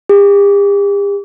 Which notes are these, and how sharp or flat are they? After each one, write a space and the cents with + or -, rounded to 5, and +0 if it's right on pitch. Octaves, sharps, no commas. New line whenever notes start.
G4 +45